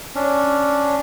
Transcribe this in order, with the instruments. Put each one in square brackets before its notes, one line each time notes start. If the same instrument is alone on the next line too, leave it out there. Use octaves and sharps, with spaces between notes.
[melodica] C#4 D4